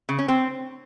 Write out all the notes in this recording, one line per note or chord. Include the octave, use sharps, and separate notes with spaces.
C#3
C#4
C4